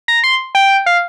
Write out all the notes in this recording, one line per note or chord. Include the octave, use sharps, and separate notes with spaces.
A#5
C6
G5
F5